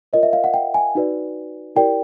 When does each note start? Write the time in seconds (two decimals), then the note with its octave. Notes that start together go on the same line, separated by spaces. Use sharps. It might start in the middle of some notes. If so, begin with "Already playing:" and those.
0.13 F4 A#4 C#5 D#5
0.23 E5
0.33 F5
0.44 F#5
0.54 G5
0.74 G#5
0.95 D#4 F#4 B4 D5
1.76 E4 G4 A#4 D5 G5